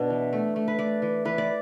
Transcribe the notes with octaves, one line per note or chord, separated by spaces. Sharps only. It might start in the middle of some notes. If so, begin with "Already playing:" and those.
Already playing: B2 D4
E3
A3
A3
B4
A3 D5
E3
E3 B4
D5